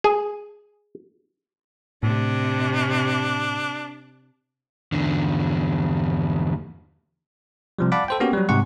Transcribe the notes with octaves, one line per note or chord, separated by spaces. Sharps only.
G#4
A2 C3 D4
E2 D3
C3 F3 G3
D5 F5 F#5 A5 B5 D6
A4 C5 G5
A#3 B3 C#4 F#4 G4
F#3 G3
G#2 C3 F#5 C#6